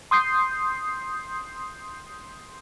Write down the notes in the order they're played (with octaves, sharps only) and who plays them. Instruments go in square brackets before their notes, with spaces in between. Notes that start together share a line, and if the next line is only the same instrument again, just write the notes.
[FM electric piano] C6 D#6 G6 C7